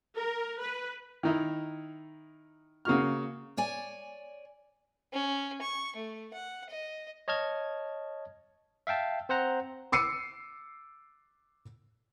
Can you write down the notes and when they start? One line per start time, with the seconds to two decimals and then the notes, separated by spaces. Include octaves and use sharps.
0.18 A#4
0.61 B4
1.23 D#3 D#4 E4
2.85 C#3 A#3 F#4 F6
3.57 C#5 D5 G#5
5.13 C#4
5.62 C#6
5.96 A3
6.33 F#5
6.70 D#5
7.28 C#5 D#5 A5 F6 G#6
8.87 E5 F5 G5 A5
9.29 C4 C5 F#5 A#5
9.92 D6 E6 C7 C#7 D#7